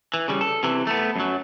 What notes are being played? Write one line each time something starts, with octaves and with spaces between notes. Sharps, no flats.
E3
C#3 G3
A4
C3 E3
A3 B3
F#2 F#3